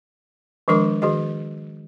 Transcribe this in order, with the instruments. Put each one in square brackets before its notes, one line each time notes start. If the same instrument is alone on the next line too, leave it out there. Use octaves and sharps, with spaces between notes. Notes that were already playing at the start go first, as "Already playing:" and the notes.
[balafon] D#3 F3 G#3 D4 A#4 D6
D#3 F#4 G#4 D#5